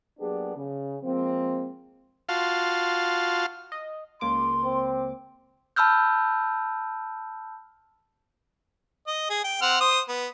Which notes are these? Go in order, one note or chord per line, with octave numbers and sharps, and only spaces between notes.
F#3 A#3 B3 D4 G4 G#4
C#3
F3 G#3 A#3 C4
F4 F#4 F5 A5 C6
D#5
C#2 A#3 C6 D6
C4
A5 B5 E6 F6 G6
D#5
G#4
G5
C4 F#5 F6
C5 D#6
B3